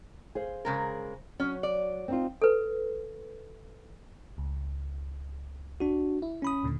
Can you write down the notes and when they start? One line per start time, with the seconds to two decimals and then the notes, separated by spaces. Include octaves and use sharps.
0.35 G#4 C5 F5
0.65 C#3 G#3 A#4
1.40 F#3 C#4
1.63 D5
2.08 C4 D#4 F4
2.42 A4 B4
4.38 C#2
5.80 D4 F#4
6.22 E4
6.42 C#4 B5 D#6
6.63 D#2 A#2 D3